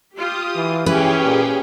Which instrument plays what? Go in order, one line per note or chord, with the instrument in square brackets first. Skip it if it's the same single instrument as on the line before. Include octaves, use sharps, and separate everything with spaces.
[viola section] F4 G4 [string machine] D#6
[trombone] E3
[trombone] E3 [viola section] C#4 [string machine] G4 G#4 G5 [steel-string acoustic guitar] B4
[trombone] A#2